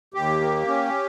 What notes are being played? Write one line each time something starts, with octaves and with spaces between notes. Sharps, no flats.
D#2 G4
A#3
C#4